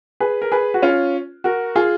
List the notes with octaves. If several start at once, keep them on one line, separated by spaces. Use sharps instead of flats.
G#4 B4
A#4
G#4 B4
F#4
C#4 F4
F#4 A#4
F4 G#4